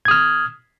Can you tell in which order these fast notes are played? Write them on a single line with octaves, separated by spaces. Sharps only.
G#6 D#6 F6